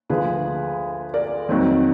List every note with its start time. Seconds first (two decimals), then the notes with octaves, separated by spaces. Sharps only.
0.10 D2 D3 F3 G#4 B4
1.14 A#4 D5
1.49 F2 D#3 F#3